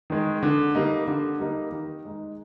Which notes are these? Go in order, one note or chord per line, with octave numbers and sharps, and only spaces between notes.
D#3 G#3
D3
G3 A#3 D#4
D3
G3 A#3 D#4
D#3
G#3 D#4